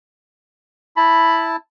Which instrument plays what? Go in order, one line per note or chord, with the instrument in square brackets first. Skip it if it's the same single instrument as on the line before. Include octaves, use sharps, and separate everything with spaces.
[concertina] E4 A5 [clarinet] B5